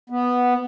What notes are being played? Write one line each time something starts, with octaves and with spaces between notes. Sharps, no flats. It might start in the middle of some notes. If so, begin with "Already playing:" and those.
B3